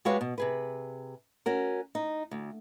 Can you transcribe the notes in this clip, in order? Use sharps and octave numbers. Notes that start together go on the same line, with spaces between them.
G#3 F#4 G4 B4 C#5 F5
B2
C3 G#4 B4
C#4 F#4 A#4
D#4
D2